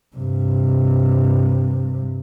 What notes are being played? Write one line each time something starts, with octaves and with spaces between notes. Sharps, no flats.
G2 C3